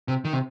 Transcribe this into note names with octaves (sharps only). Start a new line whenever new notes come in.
C3
D#3
C3